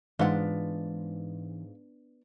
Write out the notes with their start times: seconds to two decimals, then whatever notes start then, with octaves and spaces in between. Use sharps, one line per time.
0.19 G#2 E3 B3 D4 F4 F#5